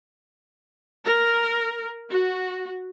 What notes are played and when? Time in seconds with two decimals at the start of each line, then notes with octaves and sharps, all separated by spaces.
1.06 A#4
2.09 F#4